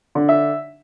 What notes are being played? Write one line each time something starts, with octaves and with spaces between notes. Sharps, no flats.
D3
E5